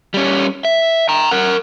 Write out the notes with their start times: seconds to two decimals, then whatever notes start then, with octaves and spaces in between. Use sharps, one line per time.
0.14 G3 C#4
0.65 E5
1.09 G5 A#5
1.31 A#4 F#5